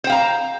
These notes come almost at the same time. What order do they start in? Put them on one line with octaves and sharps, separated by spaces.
C5 G5 F5 A#5